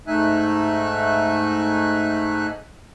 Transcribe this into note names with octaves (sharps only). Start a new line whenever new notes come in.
G#2 A3 D#4 E5 G#5 F#6